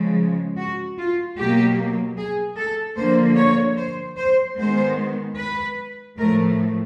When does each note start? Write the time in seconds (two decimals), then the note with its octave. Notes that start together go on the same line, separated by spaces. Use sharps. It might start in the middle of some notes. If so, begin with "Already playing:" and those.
Already playing: C#3 F3 G#3
0.57 F#4
0.98 F4
1.37 B2 F#3 A#3 G4
2.17 G#4
2.57 A4
2.97 D3 F3 A#3 C5
3.38 C#5
3.77 C5
4.18 C5
4.57 D#3 G#3 B3 C5
5.38 B4
6.17 A2 F3 A3 A#4